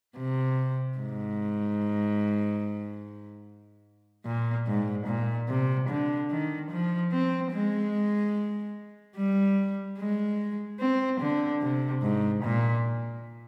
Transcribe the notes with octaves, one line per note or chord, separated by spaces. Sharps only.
C3
G#2
A#2
G#2
A#2
C3
D3
D#3
F3
C4
G#3
G3
G#3
C4
D3
C3
G#2
A#2